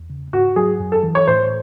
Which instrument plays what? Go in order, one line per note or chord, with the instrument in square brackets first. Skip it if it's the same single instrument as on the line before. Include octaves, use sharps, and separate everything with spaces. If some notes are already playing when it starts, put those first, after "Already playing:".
Already playing: [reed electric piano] E2
C#3
[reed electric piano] G#2 [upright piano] F#4
[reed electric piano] F#3 [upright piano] G#4
[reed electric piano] F#2
[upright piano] A4
[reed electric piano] E3
[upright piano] C#5
[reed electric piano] A2 [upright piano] C5